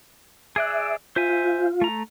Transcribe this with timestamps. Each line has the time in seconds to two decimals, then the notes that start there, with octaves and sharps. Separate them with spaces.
0.56 G#4 D5 E5 F#6
1.16 F4 C5 E5 G#5
1.81 A3 A#5